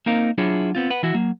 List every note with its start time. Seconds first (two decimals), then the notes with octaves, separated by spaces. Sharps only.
0.06 A#3 C4 D#4 A#4 F5
0.38 F#3 D4 E4 F4 G#4 C#5
0.75 B3 C4 F4
0.90 B4 F#5
1.03 E3 E4 F#4 E5
1.14 F#3 A#3